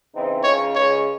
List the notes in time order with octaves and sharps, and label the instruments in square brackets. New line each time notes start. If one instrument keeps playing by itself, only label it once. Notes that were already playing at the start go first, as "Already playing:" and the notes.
[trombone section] C#3 E3 C4 D#4
[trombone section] C#2 C#3 G#3 D#4 [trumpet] C#5
[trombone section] C#2 C#3 G#3 [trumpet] C#5